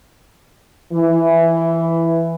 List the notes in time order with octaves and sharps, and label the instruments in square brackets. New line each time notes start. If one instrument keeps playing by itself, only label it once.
[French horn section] E3